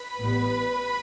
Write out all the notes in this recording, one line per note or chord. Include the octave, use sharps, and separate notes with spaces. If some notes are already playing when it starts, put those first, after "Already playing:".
Already playing: B4 B5
A1 A2 G3 B3